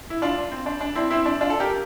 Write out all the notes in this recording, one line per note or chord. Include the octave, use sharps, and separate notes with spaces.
E4
D4 F4
C4
D4
D4
C4 E4
C4 E4
D4
D4 F4
A4
G4 A#4